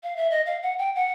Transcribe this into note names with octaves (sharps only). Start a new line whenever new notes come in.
F5
E5
D#5
F5
F#5
G5
F#5